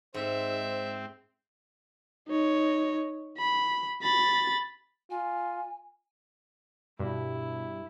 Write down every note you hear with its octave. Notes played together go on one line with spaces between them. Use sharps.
G#2 C4 C5 E5
D#4 C#5
B5
B5 A6
F4 G#5
G2 B2 E4